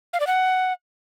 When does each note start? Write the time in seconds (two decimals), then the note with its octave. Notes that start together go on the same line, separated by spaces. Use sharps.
0.13 F5
0.20 D5
0.27 F#5